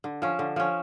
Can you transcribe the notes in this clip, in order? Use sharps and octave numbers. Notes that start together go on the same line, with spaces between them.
D3
F3 C#4
D3
F3 C#4